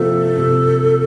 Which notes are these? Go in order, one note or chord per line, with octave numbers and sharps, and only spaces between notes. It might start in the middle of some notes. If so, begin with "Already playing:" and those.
Already playing: C3 F3 A#3 A4
C3